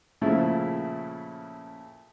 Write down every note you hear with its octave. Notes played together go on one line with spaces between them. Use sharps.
A#2 C#3 F3 A3 E4